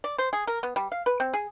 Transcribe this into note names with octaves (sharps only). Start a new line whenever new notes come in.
D5
C5
G#4
A#4
B3
G3
F5
B4
C4
G#4